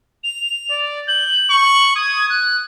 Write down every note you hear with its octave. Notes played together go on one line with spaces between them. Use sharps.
F7
D5
G6 F#7
C#6
D#6 G#6
F#6